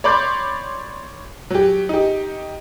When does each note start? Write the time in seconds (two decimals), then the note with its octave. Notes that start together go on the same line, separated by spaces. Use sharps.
0.04 C#5 D5 B5 C6 D6 G6
1.50 F#3 G4
1.89 D#4 G4